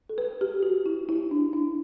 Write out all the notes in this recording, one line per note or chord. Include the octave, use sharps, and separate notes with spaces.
A4
B4
G4
F#4
E4
E4
D4
D4